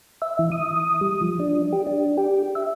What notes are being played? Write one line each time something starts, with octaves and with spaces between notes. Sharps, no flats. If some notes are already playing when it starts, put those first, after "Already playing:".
E5
E3
D#6
G3
F3
D4
G4
D4
G4
E5